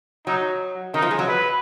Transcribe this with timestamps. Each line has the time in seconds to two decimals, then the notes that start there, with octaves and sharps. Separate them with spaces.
0.26 F#3 D#4
0.94 D#3 D#4
1.02 F3
1.11 G#3
1.19 F#3
1.28 B4